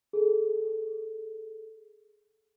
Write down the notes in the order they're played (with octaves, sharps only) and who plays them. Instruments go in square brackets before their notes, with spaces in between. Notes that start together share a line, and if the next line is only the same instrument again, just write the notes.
[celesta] G#4 A4